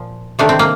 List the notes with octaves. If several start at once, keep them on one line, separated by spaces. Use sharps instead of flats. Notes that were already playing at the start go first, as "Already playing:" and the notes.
Already playing: A#2 F3
C3 D#3 A3 D4
C4
A#3